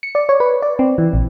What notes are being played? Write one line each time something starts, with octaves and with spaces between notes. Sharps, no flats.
C#7
D5
C#5
B4
D5
C4
E3
A#1